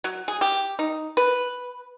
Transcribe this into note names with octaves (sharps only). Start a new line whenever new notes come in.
F#3
G#4
G4
D#4
B4